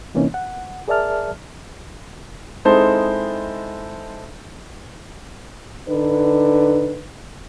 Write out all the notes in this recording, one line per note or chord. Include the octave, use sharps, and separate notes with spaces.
C3 E3 A#3 C4 C#4 D#4
F#5
G#4 A#4 D5 E5 A5 F6
G#3 C4 D#4 E4 A4 C5
D3 D4 D#4 B4